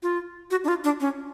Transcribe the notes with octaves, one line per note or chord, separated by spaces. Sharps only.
F4
F#4
D4
F4
D4
C#4